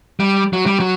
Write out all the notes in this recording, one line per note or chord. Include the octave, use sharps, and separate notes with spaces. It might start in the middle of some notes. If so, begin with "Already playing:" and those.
G3
F#3
G3
F#3